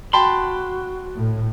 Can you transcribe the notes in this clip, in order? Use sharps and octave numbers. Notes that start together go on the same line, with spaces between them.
F#4 G5 A5 B5 C6
A2